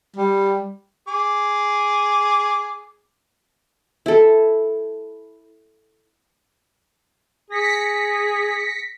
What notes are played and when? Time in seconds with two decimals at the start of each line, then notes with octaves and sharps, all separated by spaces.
0.16 G3
1.08 G#4 D6
4.06 E4 A4
7.50 G#4 A#6 B6 C#7